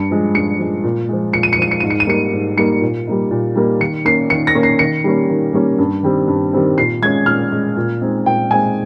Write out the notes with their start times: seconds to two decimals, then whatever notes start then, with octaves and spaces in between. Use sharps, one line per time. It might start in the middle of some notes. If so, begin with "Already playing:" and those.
Already playing: G2 C#7
0.11 F3 G#3
0.35 G2 C#7
0.59 F3 G#3
0.83 A#2
1.09 F3 G#3
1.33 A#2 C#7
1.43 D#7
1.53 C#7
1.58 F3 G#3 D#7
1.71 C#7
1.80 G#2 D#7
1.90 C#7
2.00 D#7
2.07 G3 A#3 D#4 C#7
2.33 G#2
2.57 G3 A#3 D#4 C#7
2.81 A#2
3.07 G3 A#3 D#4
3.31 A#2
3.56 G3 A#3 D#4
3.80 D#3 C#7
4.05 A#3 C#4 C7
4.30 D#3 C#7
4.47 A#6
4.55 A#3 C#4
4.63 C7
4.79 D#3 C#7
5.04 G3 A#3 C#4
5.29 D#3
5.53 G3 A#3 C#4
5.78 G2
6.03 D#3 G3 C4
6.28 G2
6.53 D#3 G3 C4
6.78 A#2 C7
7.02 G#3 C#4 G#6
7.26 A#2 F6
7.52 G#3 C#4
7.77 A#2
8.01 G#3 C4 D#4
8.26 A#2 G5
8.51 G#3 C4 D#4 G#5